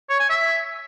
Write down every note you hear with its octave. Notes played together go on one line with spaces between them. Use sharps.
C#5
G#5
E5